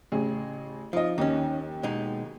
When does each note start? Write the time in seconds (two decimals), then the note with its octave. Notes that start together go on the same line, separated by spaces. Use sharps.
0.12 A1 C#3 G#4
0.93 F3 D#4 D#5
1.18 D#2 C#4 D#4
1.83 B2 G#3 D#4